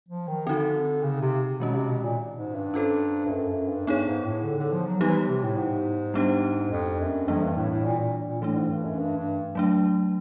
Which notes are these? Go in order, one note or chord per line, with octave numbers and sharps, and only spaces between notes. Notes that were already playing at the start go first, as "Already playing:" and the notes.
F3
D#3
D3 C4 D#4 F#4
C#3
C3
B2 D#3 G#3 C#4
C3
B2
A#2
G#2
G2
C#4 F4 A4 C5
G2
F#2
F#2
G2
G2 B3 D#4 G#4 C#5
G#2
A2
D3
D3
F3
F#3
E3 G3 B3 D#4 G4
C3
A2
G#2
G3 B3 D4 G4 C5
F2
F#2
F2 E3 G3 A#3 D4
G2
A2
A2
A#2
A#2
A#2
A2 E3 A3 D4
G#2
G2
F#2
G2
G2
F#3 A3 D4